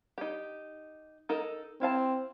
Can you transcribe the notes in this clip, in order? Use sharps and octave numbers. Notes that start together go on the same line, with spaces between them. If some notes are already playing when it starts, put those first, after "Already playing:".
D#4 G4
D#4 A4 A#4
C4 E4 F5 A5